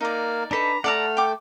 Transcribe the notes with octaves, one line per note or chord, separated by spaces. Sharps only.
A#3 D#4 A#4 D5
D4 D#4 A4 B4 A#5
A3 D5 F#5 A5 A#5 F6
G5 D6